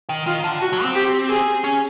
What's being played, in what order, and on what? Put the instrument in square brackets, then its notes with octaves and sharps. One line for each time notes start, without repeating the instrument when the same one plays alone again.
[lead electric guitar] D#3
[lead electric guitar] D#3 [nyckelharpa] F4
[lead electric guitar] D3
[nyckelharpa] F#4
[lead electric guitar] F#3
C4
[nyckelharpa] G4
G#4
[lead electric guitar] C#4